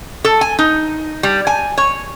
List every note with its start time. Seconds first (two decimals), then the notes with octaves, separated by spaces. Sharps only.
0.25 A4
0.41 G#5
0.59 D#4
1.23 G3
1.47 G#5
1.78 C#5